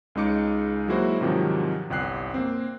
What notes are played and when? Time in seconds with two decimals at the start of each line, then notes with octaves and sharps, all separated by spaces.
0.15 C#2 C#3 G#3 D#4 D6 C#7
0.88 F#3 G#3 A#3 E4 F#4 C5
1.21 G#2 C3 D#3 F3 F#3
1.90 G1 C2 G5 F#6 C7
2.34 A#3 C4